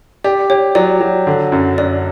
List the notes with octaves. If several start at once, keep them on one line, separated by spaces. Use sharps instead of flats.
G4 D5
G4 C#5
F#3 D5
F#3
D3
F#2
F#2 D5